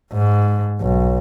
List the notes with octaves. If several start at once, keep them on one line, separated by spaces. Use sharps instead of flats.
G#2
B1